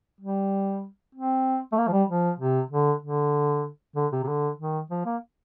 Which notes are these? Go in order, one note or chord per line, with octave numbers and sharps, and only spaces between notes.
G3
C4
A3
A#3
F3
G3
F3
C3
D3
D3
D3
C3
C3
D3
D#3
F3
A#3